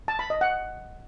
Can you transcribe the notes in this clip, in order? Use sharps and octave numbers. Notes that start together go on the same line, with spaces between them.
A5
B5
D#5
F#5